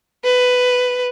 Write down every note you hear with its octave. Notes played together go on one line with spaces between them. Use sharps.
B4